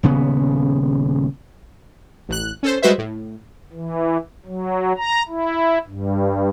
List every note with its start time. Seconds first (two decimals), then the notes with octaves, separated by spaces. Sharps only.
0.03 D#1 C#3 B3
2.29 A1 F#6
2.63 C#4 A4 C5
2.82 G3 G#3 F#4 B4 C5 E5
2.98 A2
3.73 E3
4.46 F#3
4.97 A#5
5.28 E4
5.87 G2